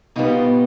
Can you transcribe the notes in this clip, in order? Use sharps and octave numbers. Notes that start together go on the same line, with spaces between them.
B2 G3 B3 D#4 F4